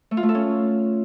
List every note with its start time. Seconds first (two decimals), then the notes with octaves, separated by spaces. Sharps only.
0.11 A3
0.17 F4
0.23 A3
0.29 A4
0.35 C#4